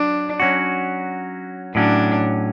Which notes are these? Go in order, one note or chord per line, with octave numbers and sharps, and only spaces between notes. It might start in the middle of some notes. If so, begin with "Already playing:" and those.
Already playing: F#3 D4
F#3 C#4 F#4
A2 F#3 C#4 D4